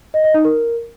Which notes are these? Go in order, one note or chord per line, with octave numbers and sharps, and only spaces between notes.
D#5
D#5
D#4
A#4